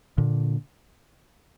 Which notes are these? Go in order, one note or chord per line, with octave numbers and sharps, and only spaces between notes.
A#2 D3